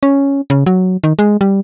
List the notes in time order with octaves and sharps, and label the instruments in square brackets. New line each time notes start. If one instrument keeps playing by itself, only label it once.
[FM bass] C#4
C#3
F#3
D#3
G#3
G3